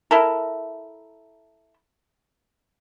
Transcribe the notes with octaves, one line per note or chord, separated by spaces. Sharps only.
E4 A4 A#4